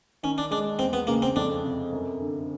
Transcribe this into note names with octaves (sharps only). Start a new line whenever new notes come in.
D#3 C#4
D4
G#3 D4
E2 C4
B3
C#3 A#3
C4
F2 D4
C3
F#2
D3